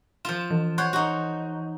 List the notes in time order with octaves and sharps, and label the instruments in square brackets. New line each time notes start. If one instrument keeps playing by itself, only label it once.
[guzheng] F3 F4 [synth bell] E7
[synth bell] E3
[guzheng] C5 C#5 F#5
D#4 F#4